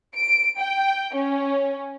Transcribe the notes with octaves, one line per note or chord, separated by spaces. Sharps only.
D7
G5
C#4